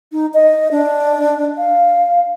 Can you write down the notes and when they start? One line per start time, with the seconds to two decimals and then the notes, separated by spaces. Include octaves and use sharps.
0.12 D#4
0.34 D#5
0.71 D4
1.58 F5